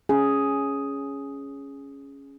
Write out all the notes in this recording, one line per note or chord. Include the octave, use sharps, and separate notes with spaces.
C#4 G#4